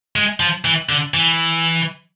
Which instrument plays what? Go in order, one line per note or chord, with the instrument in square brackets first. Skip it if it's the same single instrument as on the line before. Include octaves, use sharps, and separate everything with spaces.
[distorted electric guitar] G#3
F3
E3
D3
E3